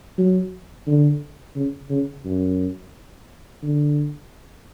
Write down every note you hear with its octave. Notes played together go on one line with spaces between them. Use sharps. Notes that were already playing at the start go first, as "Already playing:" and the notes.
F#3
D3
C#3
C#3
F#2
D3